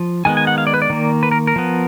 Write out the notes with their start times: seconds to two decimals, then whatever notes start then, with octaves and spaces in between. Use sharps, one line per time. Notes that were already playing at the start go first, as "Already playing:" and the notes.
Already playing: F3
0.25 D#3 G#3 B3 G#5
0.37 G#5
0.47 F#5
0.58 F5
0.67 D5
0.74 B4
0.82 D5
0.90 D#3 A#3
1.23 B4
1.31 A#4
1.47 A#4
1.56 F3 B3